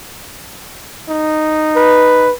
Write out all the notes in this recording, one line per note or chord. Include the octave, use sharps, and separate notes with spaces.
D#4
B4